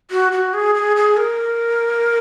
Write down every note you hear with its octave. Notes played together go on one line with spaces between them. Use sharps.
F#4
F#4
G#4
G#4
G#4
A#4